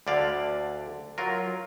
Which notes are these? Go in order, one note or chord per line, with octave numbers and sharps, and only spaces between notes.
D2 D3 D5 F5
F#3 F4 A#4